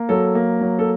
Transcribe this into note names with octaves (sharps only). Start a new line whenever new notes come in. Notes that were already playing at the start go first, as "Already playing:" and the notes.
Already playing: A#3
F#3 A4
A#3
F#3
A4